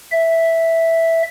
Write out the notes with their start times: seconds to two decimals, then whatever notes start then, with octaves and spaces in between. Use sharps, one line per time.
0.11 E5